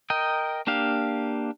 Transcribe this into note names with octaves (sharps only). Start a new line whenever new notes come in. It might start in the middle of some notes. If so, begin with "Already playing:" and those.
A#4 D#5 G5
A#3 D4 G4 F5